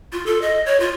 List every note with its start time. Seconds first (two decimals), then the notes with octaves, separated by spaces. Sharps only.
0.12 F4
0.26 A4
0.42 D#5
0.66 C#5
0.80 F4